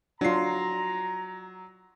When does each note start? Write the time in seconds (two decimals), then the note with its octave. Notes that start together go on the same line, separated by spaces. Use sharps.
0.21 F#3 D4 F4 A#5 C7